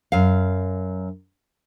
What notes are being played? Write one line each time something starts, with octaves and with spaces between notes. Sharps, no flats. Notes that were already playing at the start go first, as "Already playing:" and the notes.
F#2 F5